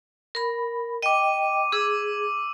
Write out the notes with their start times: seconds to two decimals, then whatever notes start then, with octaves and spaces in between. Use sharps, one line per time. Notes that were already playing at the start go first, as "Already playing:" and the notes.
0.35 A#4 B5
1.02 D#5 G5 D6 D#7
1.72 G#4 D6 E6